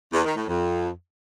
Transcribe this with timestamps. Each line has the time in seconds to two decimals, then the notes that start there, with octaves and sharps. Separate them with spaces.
0.12 E2
0.24 D#3
0.36 A2
0.47 F2